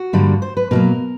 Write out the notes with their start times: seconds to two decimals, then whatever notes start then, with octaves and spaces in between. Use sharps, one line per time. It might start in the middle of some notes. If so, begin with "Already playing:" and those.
Already playing: F#4
0.13 G2 D3 G3 A#3
0.42 C5
0.57 B4
0.71 B2 F#3 A#3 A#4